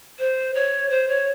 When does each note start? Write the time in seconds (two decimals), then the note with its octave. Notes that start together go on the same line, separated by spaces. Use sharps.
0.19 C5
0.54 C#5
0.90 C5
1.08 C#5